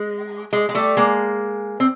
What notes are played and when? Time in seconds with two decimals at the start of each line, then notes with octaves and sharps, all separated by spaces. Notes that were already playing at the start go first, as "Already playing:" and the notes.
Already playing: G#3
0.53 G#3
0.69 G#3
0.75 G3 A3
0.97 G#3 A#3
1.80 C4